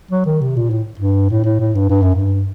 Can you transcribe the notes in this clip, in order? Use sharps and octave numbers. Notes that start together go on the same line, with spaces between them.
F#3
D#3
C3
A#2
A2
G2
A2
A2
A2
G2
G2
F#2
G2